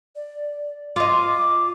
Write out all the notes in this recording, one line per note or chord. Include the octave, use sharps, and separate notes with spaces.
D5
F4 D#5 D6